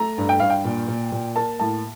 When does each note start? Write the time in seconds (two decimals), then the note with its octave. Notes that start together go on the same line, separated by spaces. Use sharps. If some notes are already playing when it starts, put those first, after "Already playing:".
Already playing: A3 A#5
0.18 G2
0.29 G5
0.40 G2 F5
0.50 G5
0.65 A#2
0.88 A#2
1.12 A#2
1.36 A#3 A5
1.59 A2 A5